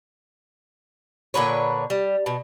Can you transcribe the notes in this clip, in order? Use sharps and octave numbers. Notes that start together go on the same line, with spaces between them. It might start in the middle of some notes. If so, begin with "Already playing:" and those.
A#2 D3 B4 C#5
G3
B2